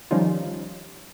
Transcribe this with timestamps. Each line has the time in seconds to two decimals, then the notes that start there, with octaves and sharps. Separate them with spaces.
0.11 D#3 F3 G3 C#4 D#4 F4